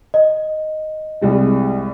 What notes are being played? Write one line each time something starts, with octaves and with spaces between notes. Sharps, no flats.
D#5
C2 G3 G#3